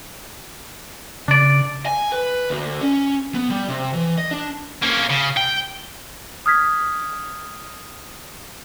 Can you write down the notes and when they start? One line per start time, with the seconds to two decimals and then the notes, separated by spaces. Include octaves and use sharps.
1.28 C#3 D4 D5
1.86 G#5
2.12 B4
2.50 D2
2.81 C#4
3.34 B3
3.50 G3
3.69 C3
3.94 E3
4.18 D#5
4.31 D4
4.83 A#3 C#4
5.10 C#3
5.37 G5
6.46 D#6 F6 G#6 B6